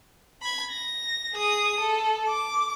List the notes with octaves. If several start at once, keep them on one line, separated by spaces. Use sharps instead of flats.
B5 G#6
A#6
G#4 D#6
A4
D6